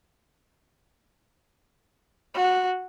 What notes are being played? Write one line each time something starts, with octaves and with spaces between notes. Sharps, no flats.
F#4